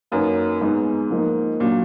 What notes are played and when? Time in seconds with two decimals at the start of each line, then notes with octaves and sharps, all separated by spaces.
0.11 F#2 A#3 D#4 F#4 B4
0.61 G#2 G#3 B3 D#4
1.11 F3 A#3 D#4
1.60 A#2 F#3 D4 F#4